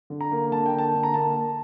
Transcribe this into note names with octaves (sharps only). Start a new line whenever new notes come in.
D3
A#5
A#3
D3 A5
G5
A#3
A5
D3
A#5
A#3 A5
A#3